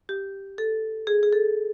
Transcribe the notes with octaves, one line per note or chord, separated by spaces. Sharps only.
G4
A4
G#4
G#4
A4